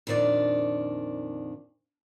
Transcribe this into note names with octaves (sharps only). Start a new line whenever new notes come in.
F2 A#2 D#3 D4 D5